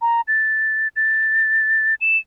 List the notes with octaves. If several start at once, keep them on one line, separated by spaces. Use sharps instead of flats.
A#5
A6
A6
E7